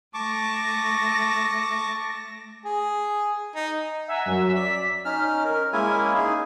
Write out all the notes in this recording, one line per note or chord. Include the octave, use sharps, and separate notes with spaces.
A3 A5 C#6 D6 A#6
G#4
D#4
E5 F#5 G#5 A#5
F#2 F#3
D5 B6
C#4 D#4 F6
A#4
G#3 A#3 C#4 E4 E5 G#5
D#4 G#4